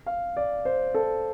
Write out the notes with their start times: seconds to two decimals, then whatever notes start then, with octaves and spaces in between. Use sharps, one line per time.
0.06 F5
0.37 D5
0.65 C5
0.94 A4